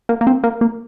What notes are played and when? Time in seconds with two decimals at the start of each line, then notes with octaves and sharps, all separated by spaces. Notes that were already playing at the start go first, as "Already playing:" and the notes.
0.09 A#3
0.21 A#3
0.27 C4
0.44 A#3
0.61 A#3